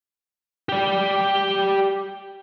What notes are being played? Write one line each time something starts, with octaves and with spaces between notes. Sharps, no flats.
G4 D5